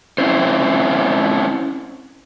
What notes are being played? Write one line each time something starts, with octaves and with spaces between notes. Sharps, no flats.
C4 C#4 E4 C5